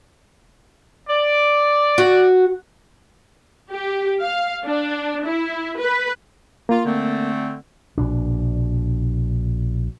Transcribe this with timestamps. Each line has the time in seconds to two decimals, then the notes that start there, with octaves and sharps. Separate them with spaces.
1.09 D5
1.98 F#4
3.70 G4
4.20 F5
4.65 D4
5.25 E4
5.78 B4
6.69 A#3 F4
6.85 D3 A3 C4
7.98 A#1 B2 D4